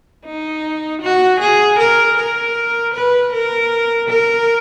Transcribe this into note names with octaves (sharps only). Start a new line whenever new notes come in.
D#4
F#4
G#4
A#4
A#4
B4
A#4
A#4